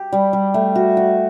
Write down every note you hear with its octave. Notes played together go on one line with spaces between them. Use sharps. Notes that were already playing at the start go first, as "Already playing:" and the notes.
Already playing: G4
G3
G3
A3
F#4
F#4